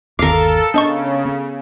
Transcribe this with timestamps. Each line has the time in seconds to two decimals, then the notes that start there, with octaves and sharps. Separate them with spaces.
0.19 G1 D#2 A4 A#4 F5 D6 C7
0.74 C#3 B3 D4 D#5 C#6
1.25 B3